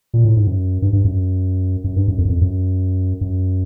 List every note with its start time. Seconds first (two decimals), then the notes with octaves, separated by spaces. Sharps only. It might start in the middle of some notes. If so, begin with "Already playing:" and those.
0.14 A#2
0.25 A2
0.37 G#2
0.47 F#2
0.82 G2
0.93 G2
1.05 F#2
1.84 F#2
1.96 G2
2.08 F#2
2.18 F2
2.25 F#2
2.30 F2
2.41 F#2
3.21 F#2